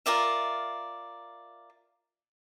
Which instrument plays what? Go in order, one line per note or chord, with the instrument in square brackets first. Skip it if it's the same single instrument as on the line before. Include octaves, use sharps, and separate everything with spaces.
[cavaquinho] F4 A#4 D5 E5